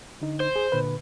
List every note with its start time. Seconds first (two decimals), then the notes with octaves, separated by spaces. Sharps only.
0.22 D3 D#4
0.40 C5
0.56 G#4
0.72 A#2 D3 B4